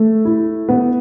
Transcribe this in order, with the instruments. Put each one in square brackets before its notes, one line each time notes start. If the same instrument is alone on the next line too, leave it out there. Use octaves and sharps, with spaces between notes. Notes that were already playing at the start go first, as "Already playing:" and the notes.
Already playing: [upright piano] A3
E4
B3